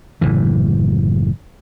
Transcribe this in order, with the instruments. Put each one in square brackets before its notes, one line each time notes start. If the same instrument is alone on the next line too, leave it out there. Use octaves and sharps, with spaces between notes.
[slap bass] F#1 A2 E3